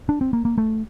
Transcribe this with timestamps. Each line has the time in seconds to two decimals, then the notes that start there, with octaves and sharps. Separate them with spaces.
0.09 D4
0.21 C4
0.33 A#3
0.45 A#3
0.58 A3